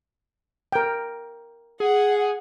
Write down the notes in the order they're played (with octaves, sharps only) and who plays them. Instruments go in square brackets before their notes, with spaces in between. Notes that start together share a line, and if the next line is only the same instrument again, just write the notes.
[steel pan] A#4 G5
[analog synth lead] G#4 [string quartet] F#5